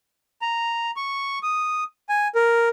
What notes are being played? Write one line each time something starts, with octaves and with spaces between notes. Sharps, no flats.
A#5
C#6
D#6
G#5
A#4